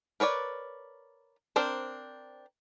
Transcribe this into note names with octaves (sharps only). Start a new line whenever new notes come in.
A#4 B4 C#5 D5
C4 D4 A#4 C5